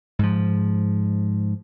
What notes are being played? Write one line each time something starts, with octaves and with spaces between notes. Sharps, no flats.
G#2 F3